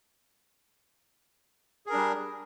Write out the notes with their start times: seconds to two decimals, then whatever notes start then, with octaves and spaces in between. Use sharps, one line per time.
1.86 G#4
1.89 A#4
1.92 D4
1.95 G3